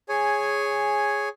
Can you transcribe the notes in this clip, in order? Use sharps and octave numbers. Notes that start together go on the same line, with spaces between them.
G#4 C#5 G#5